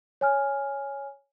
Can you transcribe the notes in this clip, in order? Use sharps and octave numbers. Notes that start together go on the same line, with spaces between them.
C#5 G#5 F6